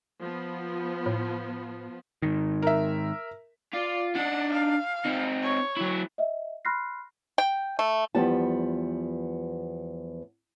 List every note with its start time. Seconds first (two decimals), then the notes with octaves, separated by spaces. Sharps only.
0.21 F3 B3
1.06 A2
2.22 G#2 D#3
2.62 A#4 E5
3.73 F4 D5
4.15 D4 D#4 F#5
4.52 F5
5.05 C4 D#4
5.43 C#5
5.77 F#3 E4
6.18 D#5 E5
6.65 B5 C6 F6 F#6 A#6 C7
7.38 G5
7.79 A3
8.15 E2 F3 G3 B3 G4 A5